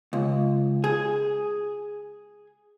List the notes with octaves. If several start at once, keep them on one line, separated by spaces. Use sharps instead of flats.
C#2
G#4